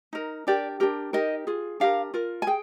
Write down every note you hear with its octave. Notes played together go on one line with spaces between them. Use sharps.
D#4 A#4
D4 G4 A#4 D5
D4 G4 A#4
D#4 G4 A#4 D#5
F4 G#4
D4 G4 A#4 F5
F4 A#4
G#5
G#4 G5